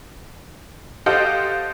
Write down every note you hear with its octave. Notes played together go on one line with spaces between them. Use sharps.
G4 A4 C5 D#5 F5 F#5